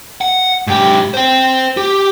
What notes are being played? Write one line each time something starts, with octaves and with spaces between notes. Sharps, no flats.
F#5
G#2 G4
C5 G5
G4